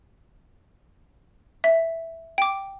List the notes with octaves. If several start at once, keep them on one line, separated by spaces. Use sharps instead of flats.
E5
G5 D6